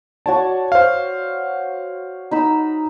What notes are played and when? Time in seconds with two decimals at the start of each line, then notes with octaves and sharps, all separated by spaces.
0.26 F#4 C#5 D5 A5
0.72 C5 F5
2.31 D#4 B5 E6